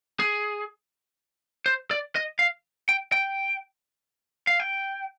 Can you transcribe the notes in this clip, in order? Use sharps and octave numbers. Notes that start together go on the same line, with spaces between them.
G#4
C5
D5
D#5
F5
G5
G5
F5
G5